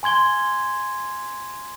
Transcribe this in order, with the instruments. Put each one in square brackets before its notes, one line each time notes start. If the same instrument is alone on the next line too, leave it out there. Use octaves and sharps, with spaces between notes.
[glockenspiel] G#5 C6 G#6 G7